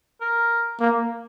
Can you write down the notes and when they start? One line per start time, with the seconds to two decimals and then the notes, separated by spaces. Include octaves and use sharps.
0.21 A#4
0.80 A#3